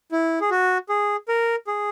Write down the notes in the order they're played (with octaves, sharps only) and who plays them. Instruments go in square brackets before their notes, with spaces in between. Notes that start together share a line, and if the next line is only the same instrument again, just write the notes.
[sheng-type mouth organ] E4
G#4
F#4
G#4
A#4
G#4